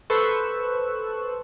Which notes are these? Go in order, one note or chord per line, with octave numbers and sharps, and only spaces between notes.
A4 B4 C5 C#6 E6 F#6